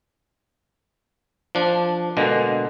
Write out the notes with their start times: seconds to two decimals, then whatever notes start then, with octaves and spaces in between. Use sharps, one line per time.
1.55 F3 D4
2.17 B2 D3 G#3 A#3